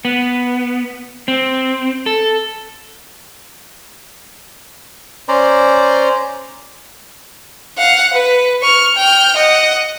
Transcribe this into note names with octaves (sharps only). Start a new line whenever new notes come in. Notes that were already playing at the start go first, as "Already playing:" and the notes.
B3
C4
A4
C#4 C5 D5 A#5
F5 F#5
B4
C#6 F6
G5 F6
D#5 F#5